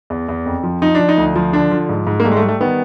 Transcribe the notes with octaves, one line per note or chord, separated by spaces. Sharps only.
E2
E2
F2
F3
F3 D#4
F3 D4
D#4
D2
F3
D3 D4
F3
G#2
G#2
A#3
G3 A3
G#3
A3
G3
A3
D#3 B3